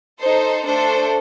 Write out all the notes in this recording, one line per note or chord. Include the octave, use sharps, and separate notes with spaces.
D#4 A4 C5
A3 D4 A4 C5